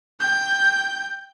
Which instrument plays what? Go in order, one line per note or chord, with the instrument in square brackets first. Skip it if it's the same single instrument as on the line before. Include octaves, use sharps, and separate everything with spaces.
[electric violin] G5 G6